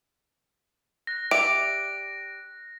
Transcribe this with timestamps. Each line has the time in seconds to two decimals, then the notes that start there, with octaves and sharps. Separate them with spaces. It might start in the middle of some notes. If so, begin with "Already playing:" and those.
1.07 F#6 A#6
1.31 G4 D5 E5 D7